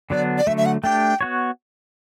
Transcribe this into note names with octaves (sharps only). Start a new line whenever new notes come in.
D3 F#3 B3 D4 D5
D5
D3 F#3 A3 E5
E5
F#5
A3 D4 G4 G5
B3 F#4 C#5